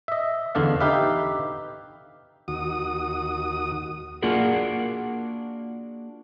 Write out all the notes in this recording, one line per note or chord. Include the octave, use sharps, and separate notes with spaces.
D#5 E5
E2 D3 D4 D5 F5
D#4 G4 B4 E5 F5
D#2 F#4 D#6
A#3 D4 F4 F#4 G#4 A#4